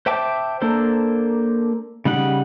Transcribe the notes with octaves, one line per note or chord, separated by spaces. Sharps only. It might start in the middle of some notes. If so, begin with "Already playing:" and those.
C5 E5 G5 A5 D6
A#3 D4 A4 C5
C#3 G3 D#4 F#5